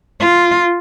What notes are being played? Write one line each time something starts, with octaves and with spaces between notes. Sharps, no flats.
F4